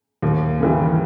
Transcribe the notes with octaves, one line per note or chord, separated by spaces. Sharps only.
D#2
C#3 E3 G3